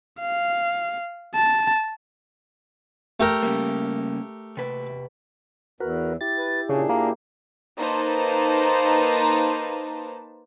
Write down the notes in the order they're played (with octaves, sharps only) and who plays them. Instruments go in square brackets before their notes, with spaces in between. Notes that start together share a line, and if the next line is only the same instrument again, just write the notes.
[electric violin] F5
A5
[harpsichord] A3 G4 A#4
[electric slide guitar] C#3 G3 A#3
C3 B4
[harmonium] E2 [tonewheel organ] F#4 A#4 B4
[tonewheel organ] E4 G4 [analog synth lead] A6
[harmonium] B4
[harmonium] A#2 D4 G#4 [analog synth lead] C#3
[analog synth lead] A#3
[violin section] A#3 D#4 B4 C5 A5